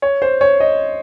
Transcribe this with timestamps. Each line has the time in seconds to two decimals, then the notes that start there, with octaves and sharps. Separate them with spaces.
0.02 C#5
0.22 C5
0.41 C#5
0.60 D#5